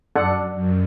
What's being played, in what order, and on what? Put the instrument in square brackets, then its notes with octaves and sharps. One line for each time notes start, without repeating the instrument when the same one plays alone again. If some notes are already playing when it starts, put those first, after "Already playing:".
[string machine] F#2 [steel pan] D4 A4 F#5
[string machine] F#2